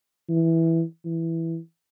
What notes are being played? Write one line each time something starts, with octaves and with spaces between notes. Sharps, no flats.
E3
E3